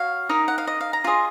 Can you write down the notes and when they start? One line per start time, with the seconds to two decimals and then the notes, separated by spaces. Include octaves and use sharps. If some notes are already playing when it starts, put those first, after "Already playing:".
Already playing: F#4 C#5 F5
0.29 D#4 A#4 D#5
0.48 F#5
0.58 F5
0.67 D#5
0.81 F5
0.93 A#5
1.04 F4 G#4 D#5 C6